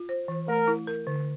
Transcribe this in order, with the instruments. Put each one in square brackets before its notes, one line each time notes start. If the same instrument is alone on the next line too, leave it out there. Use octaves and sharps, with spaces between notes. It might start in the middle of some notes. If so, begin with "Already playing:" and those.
Already playing: [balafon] F4
C5
E3
[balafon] A3 [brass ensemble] A#4
[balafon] E4
A#4
D3